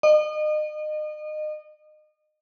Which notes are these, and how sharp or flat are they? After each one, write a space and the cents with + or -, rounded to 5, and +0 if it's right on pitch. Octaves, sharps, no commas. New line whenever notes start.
D#5 -35